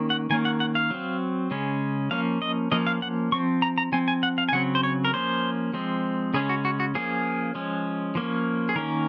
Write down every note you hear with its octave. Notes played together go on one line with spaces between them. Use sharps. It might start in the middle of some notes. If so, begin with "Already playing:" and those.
Already playing: D#3 A#3 C#4
F#5
D#3 A#3 C#4 G#5
F#5
F#5
F5
F#3 C4
C#3 G#3 C#4
F3 A#3 C#4 F5
D#5
F3 A#3 C#4 D#5
F5
F#5
F3 C4 C#6
A#5
A#5
F3 C4 G#5
G#5
F#5
F5
G#5
C#3 F#3 C4 F#5
C5
C#5
A#4
F3 A#3 C#4 C5
F3 G#3 C4
C#3 G#3 C#4 G#4
F#4
F#4
F#4
F3 A#3 C#4 G#4
F3 G#3 C#4
F3 A#3 C#4
G#4
D#3 A#3 C#4 A#4